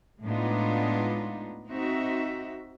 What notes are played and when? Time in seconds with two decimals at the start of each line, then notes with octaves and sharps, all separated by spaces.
0.23 A2 G#3 B3 D4 D#4 F4
1.69 C4 D#4 F#4 E5